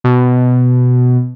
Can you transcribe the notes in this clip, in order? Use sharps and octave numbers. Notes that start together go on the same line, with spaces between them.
B2